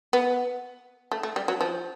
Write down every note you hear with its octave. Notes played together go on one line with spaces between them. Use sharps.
B3
A3
A3
G3
F#3
F3